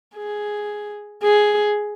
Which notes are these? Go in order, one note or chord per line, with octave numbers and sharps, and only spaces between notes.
G#4
G#4